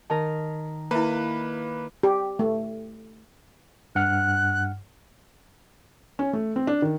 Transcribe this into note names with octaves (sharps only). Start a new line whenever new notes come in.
D#3 A#4 A5
A#3 E4 B4 E5 A#5
G4
A3
G2 F#5 F6 F#6
C#4
A3
C4
D4
D#3